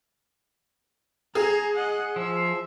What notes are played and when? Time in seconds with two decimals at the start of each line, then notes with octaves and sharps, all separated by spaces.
1.35 G#4 A#5 G#6
1.75 D#5 F#5
2.16 F3 E5